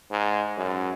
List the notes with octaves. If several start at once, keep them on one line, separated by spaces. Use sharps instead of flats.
G#2
F#2